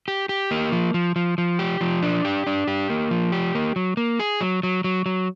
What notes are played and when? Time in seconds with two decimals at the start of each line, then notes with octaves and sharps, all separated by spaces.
0.08 G4
0.29 G4
0.51 A#3
0.72 F3
0.94 F3
1.16 F3
1.38 F3
1.59 G4
1.81 F3
2.03 D4
2.25 G4
2.47 D4
2.67 G4
2.90 A#3
3.11 F3
3.32 G4
3.55 A#3
3.76 F#3
3.97 A#3
4.19 G#4
4.41 F#3
4.63 F#3
4.84 F#3
5.06 F#3